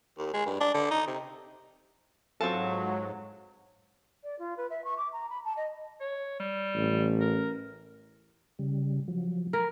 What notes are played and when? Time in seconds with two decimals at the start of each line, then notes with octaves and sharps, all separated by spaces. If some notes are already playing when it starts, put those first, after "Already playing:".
0.18 D#2
0.34 G#3
0.46 G2
0.60 D4
0.74 D3
0.91 D#4
1.07 C3
2.41 G#2 F#3 C4 F4 A4 A5 C#6
4.23 D5
4.39 F4
4.57 B4
4.70 E5
4.84 C#6
4.97 D6
5.13 A#5
5.30 B5
5.45 A5
5.57 D#5
6.01 C#5
6.40 G3
6.75 A1
7.20 A#4
8.59 C#3 G3
9.08 F3 F#3
9.53 A#4 G#5 A#5 B5